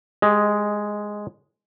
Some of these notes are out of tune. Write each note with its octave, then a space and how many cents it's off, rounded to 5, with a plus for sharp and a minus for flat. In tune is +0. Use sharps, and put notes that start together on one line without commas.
G#3 +0 G4 +25 D#5 +15